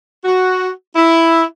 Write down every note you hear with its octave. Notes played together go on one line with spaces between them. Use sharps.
F#4
E4